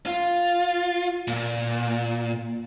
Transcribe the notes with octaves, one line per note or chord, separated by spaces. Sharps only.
F4
A#2